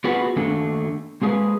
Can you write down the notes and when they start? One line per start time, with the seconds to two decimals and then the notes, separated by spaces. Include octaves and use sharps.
0.04 B3 F4 F#4 G#4 B4
0.36 D#3 A3 A#3 D4
1.22 G#3 A#3 G#4 B4